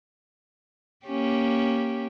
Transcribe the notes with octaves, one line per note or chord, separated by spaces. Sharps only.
A#3 C#4 G4